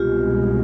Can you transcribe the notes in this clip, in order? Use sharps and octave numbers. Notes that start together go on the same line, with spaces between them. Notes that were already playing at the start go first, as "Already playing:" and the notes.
Already playing: C2 B2 G#3 F4 G4